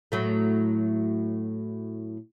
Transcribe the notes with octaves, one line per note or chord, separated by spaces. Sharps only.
A2 F#3 A3